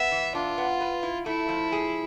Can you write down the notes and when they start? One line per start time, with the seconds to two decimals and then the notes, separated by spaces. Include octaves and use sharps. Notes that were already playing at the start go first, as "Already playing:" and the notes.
Already playing: B3 E5
0.11 E3
0.35 D4 F4
0.58 B3
0.81 B4
1.03 E4
1.26 A3 E4
1.49 F3
1.72 G#4